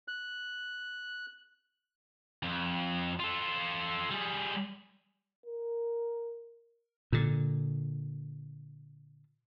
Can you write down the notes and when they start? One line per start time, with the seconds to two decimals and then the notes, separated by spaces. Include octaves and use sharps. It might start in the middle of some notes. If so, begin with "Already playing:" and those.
0.08 F#6
2.43 F2
3.20 F4 A4
4.11 G3 G#4
5.46 A#4
7.12 A#2 D3